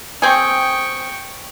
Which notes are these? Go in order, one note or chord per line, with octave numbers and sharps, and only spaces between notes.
C4 G#4 G5 C#6